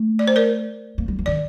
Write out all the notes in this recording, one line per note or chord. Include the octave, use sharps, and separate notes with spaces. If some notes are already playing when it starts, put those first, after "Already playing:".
Already playing: A3
D5
C5
A#4 D5
A#3
G3
F3
D#3 D5